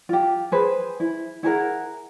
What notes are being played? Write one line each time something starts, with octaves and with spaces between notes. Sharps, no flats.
F4 G4
G#4 B4 C5
E4
E4 G#4 A#4 F#5